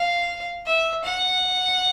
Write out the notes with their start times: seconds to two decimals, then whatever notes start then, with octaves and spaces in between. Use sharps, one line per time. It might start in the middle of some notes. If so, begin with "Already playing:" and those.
Already playing: F5
0.66 E5
1.05 F#5